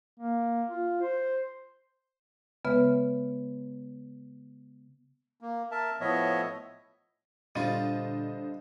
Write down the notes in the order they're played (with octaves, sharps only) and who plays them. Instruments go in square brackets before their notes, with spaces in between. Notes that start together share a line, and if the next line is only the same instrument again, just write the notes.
[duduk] A#3
F4
C5
[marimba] C#3 G#3 B3 B4 E5 F6
[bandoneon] A#3
A#4 E5 A5
A2 F3 B3 C#5 D#5 E5
[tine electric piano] A#2 [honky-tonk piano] D3 A6 D#7 [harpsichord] G3 F4 [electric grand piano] C5 D#5